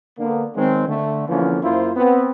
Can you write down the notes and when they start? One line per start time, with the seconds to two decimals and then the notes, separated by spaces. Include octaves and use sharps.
0.19 D3 A#3 B3
0.55 D#3 F#3 G#3 B3 C4
0.88 D3 A3
1.27 D3 E3 F3 A#3 C4 C#4
1.63 F#2 A#3 E4 F4 C5
1.96 B3 C4